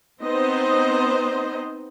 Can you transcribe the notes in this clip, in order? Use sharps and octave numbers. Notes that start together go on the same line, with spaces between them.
B3 C4 D#4 C5 D#5